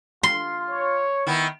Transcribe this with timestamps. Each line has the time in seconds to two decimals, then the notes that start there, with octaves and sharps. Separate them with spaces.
0.23 F4 C6
0.70 C#5
1.27 D#3 B3 E4